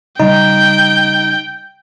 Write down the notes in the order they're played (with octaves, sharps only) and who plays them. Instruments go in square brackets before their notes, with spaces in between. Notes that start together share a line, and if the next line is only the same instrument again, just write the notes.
[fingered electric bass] C#3 G3 [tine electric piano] D#4 [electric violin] G5